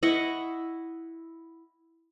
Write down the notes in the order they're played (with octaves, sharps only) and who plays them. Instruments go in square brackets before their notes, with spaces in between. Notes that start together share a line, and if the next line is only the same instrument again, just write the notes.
[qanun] E4 D#5 F#5 C#6